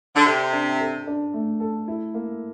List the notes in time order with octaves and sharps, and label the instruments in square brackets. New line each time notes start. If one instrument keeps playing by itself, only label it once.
[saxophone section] D3
[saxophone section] C3 [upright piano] A4
[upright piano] D4
A4
D4
A3
A4
E4
A#3